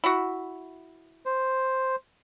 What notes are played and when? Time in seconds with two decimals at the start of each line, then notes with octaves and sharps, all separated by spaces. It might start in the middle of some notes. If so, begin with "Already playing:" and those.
0.04 E4 F#4
1.26 C5